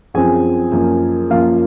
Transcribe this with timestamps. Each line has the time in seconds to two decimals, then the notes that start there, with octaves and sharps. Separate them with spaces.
0.14 F#2 F3 C4 G#4 G#5
0.72 F#2 F3 A#3
1.30 F#2 F3 A#3 F4 F5